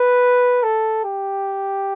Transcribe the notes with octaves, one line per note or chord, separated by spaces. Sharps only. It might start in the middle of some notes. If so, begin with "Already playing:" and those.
Already playing: B4
A4
G4